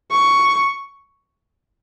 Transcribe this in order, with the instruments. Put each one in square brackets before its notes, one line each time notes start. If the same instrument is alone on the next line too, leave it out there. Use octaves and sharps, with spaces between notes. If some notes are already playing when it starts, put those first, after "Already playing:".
[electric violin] C#6